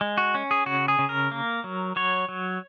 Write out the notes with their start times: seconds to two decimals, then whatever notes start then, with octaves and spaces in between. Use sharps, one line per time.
0.01 G#3
0.18 F#4
0.35 C#4
0.51 G#4
0.66 C#3 F#4
0.88 G#4
0.99 C#3
1.09 A#4
1.31 A#3
1.64 F#3
1.96 F#3 C#5
2.29 F#3